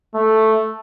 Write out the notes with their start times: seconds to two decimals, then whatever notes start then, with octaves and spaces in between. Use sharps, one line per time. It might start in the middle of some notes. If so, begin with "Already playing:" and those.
0.15 A3